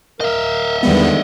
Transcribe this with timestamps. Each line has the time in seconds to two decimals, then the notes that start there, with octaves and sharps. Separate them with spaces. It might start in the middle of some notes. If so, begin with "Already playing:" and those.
0.21 A#4 D#5 E5
0.83 E2 D3 D#3 G3 G#3 B3